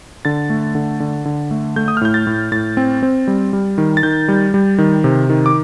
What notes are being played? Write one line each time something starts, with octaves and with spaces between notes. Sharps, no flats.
D3 A6
A3
D3
D3
D3
A3
A3 G6
D#6
F6
A2 G6
A6
A2
A2 A6
C4
C4
G3
G3
D#3
A6
D#3 G6
G3
G3
D#3
C3
D#3
D6